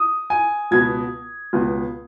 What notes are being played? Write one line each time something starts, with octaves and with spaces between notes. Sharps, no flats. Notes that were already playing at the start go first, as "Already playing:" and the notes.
Already playing: D#6
G#5
C#2 B2 B3 G#6
C#2 B2 B3